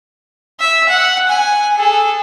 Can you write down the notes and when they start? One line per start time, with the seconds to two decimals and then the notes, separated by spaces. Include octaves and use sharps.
0.60 E5
0.89 F#5
1.29 G#5
1.76 G#4 A4